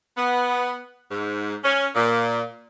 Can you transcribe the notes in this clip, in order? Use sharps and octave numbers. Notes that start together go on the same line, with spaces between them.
B3
G#2
C#4
A#2